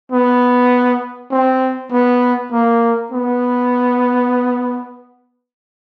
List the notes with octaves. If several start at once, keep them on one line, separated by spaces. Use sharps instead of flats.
B3
C4
B3
A#3
B3